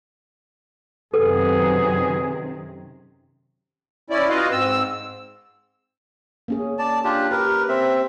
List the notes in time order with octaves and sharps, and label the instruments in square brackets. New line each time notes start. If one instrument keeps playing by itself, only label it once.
[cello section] F#2 C3 D#3 [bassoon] B3 [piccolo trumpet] G#4 [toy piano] A4
[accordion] C#4 E4 D5
F4 F#4 B4 D#5 F5
G#2 C4 E6
[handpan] A#3 C#4 G#4
[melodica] D5 A5
D4 F4 G4
[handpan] G4 [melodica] A#4 B4
[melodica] C4 E5